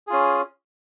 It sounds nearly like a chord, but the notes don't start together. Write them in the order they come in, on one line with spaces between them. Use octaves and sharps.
G#4 F4 C#4